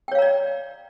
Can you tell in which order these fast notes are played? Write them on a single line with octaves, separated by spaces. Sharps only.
G5 C#5 F5 A#5 D5